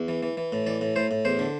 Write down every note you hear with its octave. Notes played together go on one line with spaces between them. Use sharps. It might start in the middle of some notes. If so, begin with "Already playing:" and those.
Already playing: E2
E3
E3
E3
A2
E3 D5
A2
A2 C5
A2
E2 C5
D3